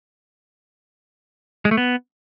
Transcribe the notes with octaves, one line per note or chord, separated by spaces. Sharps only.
G#3
A3
B3